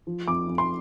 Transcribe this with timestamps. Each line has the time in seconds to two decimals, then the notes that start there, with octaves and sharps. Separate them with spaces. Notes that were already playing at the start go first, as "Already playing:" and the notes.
0.07 F3
0.28 F2 D6
0.48 F2
0.58 C6